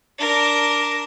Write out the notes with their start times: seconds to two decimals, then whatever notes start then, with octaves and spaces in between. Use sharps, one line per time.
0.19 D4 A#4